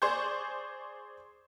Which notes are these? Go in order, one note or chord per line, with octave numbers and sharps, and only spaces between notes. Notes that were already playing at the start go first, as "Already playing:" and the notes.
G#4 C5 D5 C6 C#6 G6